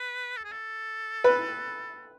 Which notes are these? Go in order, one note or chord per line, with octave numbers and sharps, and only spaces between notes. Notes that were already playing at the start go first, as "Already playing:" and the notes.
Already playing: B4
A4
G#4
A4
B4